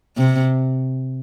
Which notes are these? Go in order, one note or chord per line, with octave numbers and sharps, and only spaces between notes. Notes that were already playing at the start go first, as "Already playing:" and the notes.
C3